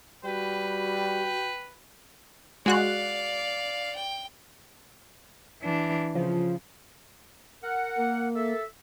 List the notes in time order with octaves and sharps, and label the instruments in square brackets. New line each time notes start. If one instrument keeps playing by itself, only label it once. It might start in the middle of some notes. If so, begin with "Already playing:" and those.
[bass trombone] G3 [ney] F#4 [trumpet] B4 [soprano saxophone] G5
[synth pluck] G#3 F#4 F#6 [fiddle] D5 F5
[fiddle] G5
[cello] E3 D4
[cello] C#3 [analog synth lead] F3
[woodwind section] A#4 F#5
[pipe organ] A#3
[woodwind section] A4 E5